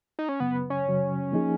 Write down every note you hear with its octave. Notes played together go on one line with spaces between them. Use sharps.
D#4
C#4
F#2 C#3 F#3 B3
C#4
F#2 C#3 F#3
F3 A#3 D#4 G#4